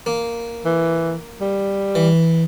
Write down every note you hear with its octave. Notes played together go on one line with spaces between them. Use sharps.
A#3
E3
G3
E3